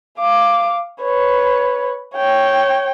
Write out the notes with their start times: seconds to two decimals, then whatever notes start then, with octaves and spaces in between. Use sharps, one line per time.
0.19 F5 D6
1.02 B4 C#5
2.16 C#5 G5